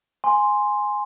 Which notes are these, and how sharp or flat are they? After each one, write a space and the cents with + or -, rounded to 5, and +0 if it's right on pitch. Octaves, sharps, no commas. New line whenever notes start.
G#5 +0 C6 +0